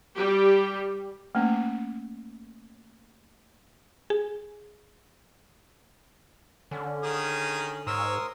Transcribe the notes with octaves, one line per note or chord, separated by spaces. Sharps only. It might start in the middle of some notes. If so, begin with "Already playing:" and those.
G3 G4
A3 A#3 C#4
G#4
D3 C#4
D#3 G#4 D#6
G#2 A#4 C#5 C6 D#6 E6